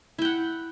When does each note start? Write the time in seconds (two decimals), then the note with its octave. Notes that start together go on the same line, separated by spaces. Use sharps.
0.18 E4
0.22 G5
0.25 F#5